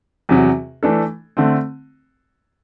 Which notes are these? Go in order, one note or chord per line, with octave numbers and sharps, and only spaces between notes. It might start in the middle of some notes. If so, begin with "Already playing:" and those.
E2 C3 F#3
E3 A3 D4 A4
D3 A3 C4